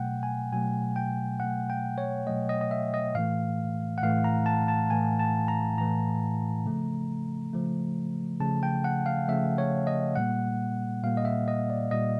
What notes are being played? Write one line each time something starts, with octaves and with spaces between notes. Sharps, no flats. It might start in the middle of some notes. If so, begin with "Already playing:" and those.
Already playing: B2 F#3 A3 F#5 G5
G#5
B2 F#3 A3 G#5
G5
B2 F#3 A3 F#5
G5
C#5
B2 F#3 A3 D#5
D#5
D#5
E5
D#5
A2 E3 A3 F5
F#5
A2 E3 A3 F5
A#5
A5
A5
A2 E3 A3 G#5
A5
A#5
A2 E3 A3 A#5
C#3 F3 A3
C#3 F3 A3
C#3 F3 A3 A5
G5
F#5
F5
C#3 F3 A3 E5
C#5
D#5
A#2 G3 A#3 F#5
A#2 G3 A#3 F5
D#5
E5
D#5
D5
A#2 G3 A#3 D#5